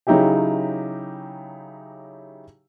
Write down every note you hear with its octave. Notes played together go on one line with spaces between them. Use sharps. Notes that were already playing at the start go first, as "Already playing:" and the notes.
C#3 F#3 D#4 E4 G4 G5